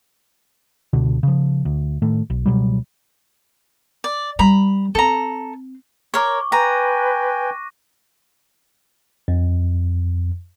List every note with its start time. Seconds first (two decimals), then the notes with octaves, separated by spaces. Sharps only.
0.93 C#2 B2 D3
1.23 C#3 F3
1.65 D2
2.02 A2 D#3 A3
2.30 B1
2.46 C#2 B2 F#3 G3
4.04 D5
4.39 G3 A#5 B5
4.95 C4 A4 A#5
6.14 A#4 C#5 C#6 D6
6.52 B4 G5 G#5 A#5 F#6 A#6 D#7
9.28 F2